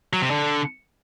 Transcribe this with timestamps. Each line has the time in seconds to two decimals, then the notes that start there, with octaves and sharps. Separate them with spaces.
0.13 F#3
0.22 C3
0.30 D3